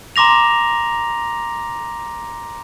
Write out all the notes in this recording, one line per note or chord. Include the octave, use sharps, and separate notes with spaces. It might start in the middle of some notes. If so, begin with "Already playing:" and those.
A#5 C6 D6 A#6 F7